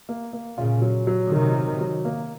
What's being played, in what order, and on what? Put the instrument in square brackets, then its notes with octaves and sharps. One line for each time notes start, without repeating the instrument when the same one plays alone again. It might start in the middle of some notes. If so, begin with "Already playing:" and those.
[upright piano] A#3
A#3
[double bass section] A#2 C#3 [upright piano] F4
[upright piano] F#3
F#3
[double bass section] C3 D#3 [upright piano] F#3
[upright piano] F#3
F#3
A#3